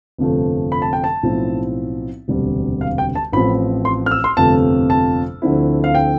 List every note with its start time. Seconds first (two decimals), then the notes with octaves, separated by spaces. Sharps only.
0.18 G1 F2 C3 F3 A3
0.72 B5
0.82 A5
0.93 G5
1.04 A5
1.23 B1 A2 F3 C4 E4
2.28 E1 D2 C3 G3
2.81 F5
2.98 G5
3.15 A5
3.33 A1 A2 F3 C4 B5
3.85 C6
4.06 F6
4.11 E6
4.24 C6
4.37 G1 F2 C3 F3 A3 A5
4.90 A5
5.42 D2 D3 F3 C4 E4
5.84 F5
5.95 G5